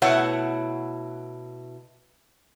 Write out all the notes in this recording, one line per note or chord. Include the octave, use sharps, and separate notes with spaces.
B2 A3 E4 B4 C#5 F#5